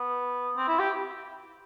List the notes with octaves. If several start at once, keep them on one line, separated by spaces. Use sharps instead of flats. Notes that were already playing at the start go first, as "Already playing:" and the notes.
Already playing: B3
C4
E4
G4